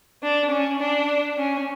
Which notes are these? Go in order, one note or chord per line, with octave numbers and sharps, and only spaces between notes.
D4
C#4
D4
C#4